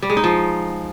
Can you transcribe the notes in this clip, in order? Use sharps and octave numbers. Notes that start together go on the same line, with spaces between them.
G3
G#3
D#4
F3